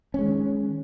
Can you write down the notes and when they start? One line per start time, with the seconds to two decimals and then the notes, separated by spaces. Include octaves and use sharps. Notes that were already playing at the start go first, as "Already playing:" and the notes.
0.14 C#4
0.19 G#3
0.23 D#3